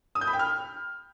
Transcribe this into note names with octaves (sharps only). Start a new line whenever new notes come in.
D#6
G6
B5
G5
F6